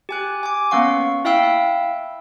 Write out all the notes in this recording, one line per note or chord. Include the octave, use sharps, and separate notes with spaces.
G4 G#5 F#6
G#5 D6
A#3 B3 C#4 F5 F#5 C#6
E4 E5 F5 G5 E6